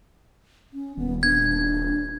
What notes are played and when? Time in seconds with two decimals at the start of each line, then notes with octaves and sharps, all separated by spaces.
0.73 C#4
0.97 D#1 B3
1.23 D4 G#6